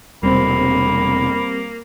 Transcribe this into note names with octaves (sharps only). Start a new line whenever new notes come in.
E1 C3 G3 A#3 C4 B5